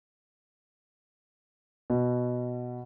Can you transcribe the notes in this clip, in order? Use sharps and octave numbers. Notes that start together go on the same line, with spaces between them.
B2